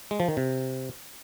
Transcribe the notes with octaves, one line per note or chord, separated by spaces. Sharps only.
G#3
F3
D#3
C3